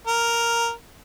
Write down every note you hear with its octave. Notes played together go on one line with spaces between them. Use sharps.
A#4